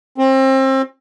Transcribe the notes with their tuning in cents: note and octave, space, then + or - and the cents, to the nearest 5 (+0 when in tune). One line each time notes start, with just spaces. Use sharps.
C4 +30